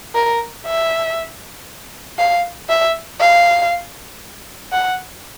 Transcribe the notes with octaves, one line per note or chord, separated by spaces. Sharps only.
A#4
E5
F5
E5
F5
F#5